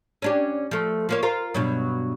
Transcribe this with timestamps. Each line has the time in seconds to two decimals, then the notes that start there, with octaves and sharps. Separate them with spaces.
0.22 C#4 D4 G4
0.71 F3 A3
1.09 F3 A#3 C#5
1.23 F4 A#4 C5
1.54 G2 B2 F#3